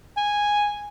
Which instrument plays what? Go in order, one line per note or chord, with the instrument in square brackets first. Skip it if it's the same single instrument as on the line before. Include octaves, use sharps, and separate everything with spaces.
[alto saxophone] G#5